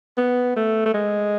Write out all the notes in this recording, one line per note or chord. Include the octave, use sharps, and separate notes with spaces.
B3
A3
A3
G#3